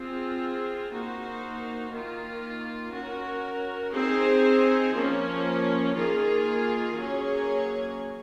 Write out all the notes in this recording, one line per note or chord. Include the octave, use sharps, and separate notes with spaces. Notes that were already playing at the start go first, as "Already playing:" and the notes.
Already playing: C4 F4 G#4
A#3 D#4 F#4 C5
D#3 A#3 F4
C#4 F#4 A#4
C4 D#4 G#4 C5
F3 A#3 C#4
D#3 A#3 F4 G#4
F#3 A#3 C#4 G#4 C#5